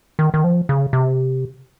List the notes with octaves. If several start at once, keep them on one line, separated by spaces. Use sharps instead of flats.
D#3
D#3
F3
C#3
C3